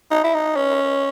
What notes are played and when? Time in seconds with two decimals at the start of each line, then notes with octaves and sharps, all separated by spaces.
0.11 D#4
0.24 E4
0.34 D#4
0.56 C#4